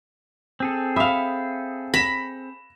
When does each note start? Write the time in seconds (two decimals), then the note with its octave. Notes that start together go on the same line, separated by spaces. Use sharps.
0.60 C4 G#4 A4
0.96 E5 F5 B5 D#6
1.94 B5 A#6 E7